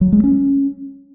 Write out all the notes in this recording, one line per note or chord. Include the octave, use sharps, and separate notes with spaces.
F#3
G#3
C#4